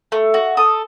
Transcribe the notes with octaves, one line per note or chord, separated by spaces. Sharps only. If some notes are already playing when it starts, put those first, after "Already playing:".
A3
F#4
A4 D#6